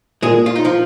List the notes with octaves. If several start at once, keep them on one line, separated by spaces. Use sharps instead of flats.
A#2 G#3 G#4
F4
D#4
F3 F4